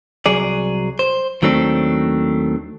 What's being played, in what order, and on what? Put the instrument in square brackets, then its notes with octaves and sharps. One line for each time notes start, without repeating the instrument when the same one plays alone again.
[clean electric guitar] C2 F#3 G#4 D5
C5
D#2 D#3 F#3 A3 C4 D4